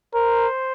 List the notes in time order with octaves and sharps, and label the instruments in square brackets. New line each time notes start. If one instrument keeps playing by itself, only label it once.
[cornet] A#4 [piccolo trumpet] C5